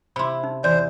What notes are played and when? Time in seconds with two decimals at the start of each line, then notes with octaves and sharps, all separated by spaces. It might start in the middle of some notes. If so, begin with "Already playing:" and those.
0.16 C3 E4 B5 C6
0.44 D#4
0.64 E2 C5 D5